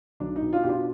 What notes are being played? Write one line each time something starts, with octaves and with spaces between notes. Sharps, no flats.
B1 D4
D#4
B2
D4 F4
B2 G4
D4 F4